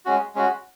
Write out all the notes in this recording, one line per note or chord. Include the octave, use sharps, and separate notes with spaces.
G#3 C#4 F#4
G#3 C#4 F#4